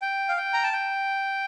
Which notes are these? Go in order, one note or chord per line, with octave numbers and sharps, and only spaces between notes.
G5
F5
G5
A#5
A5
G5